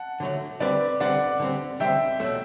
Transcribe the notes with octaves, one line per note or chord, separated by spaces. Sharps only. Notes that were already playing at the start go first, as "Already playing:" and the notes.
Already playing: F#5 A5
D3 F#3 A3
D3 G3 C4 B4 D5
D3 G3 C4 D5 F#5
D3 G3 C4
D3 G3 C4 E5 G5
B2 F#3 A3